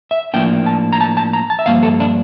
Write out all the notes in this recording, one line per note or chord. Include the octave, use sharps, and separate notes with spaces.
E5
A2 F3 A#3 D4 G5
A5
A#5
A5
A5
A#5
A5
E5
G2 F3 A#3 F5
A4
D4